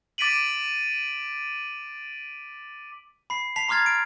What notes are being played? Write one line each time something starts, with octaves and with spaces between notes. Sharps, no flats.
D6 A6 B6 D7 D#7 F#7
B5 C7
A5 B6 C7 F7
A#5 C6 D6 F6 G#6 A6
D7